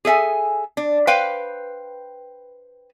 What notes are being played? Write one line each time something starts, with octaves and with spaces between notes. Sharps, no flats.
G#4 A4 E5 G#5
D4
B4 C5 F5 G5